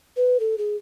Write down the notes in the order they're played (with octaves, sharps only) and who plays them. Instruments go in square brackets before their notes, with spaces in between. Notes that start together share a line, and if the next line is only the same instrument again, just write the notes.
[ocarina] B4
A4
G#4